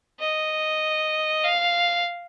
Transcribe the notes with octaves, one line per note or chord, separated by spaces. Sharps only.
D#5
F5